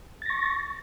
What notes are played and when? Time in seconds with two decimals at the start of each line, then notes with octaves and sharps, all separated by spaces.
0.22 A6
0.26 A#6
0.30 C#6